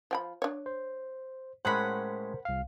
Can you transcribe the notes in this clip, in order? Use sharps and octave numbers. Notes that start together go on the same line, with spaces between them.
F3 G5 B5
D4 C#5
C5
A2 G#3 C#4 A#4 C5 F#5 B5
C2 F5